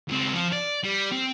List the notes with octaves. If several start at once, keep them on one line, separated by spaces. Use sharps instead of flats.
C#2 C4
F3
D5
G3
C4